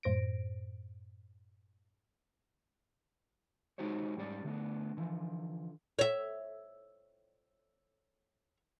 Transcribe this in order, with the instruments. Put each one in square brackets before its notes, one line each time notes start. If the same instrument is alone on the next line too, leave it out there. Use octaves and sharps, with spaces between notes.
[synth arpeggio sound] F#2 A2 C5 A#6 D7
[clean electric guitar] G#3 D#4 F#4 G4 C5 C#5
G#2 G3 C#4 G4 B4 D5
D3 A3 B3 D4
D3 E3 F3
[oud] C#5 E5